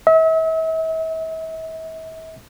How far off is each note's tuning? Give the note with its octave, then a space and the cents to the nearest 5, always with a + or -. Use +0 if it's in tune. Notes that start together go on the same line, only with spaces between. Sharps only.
E5 -40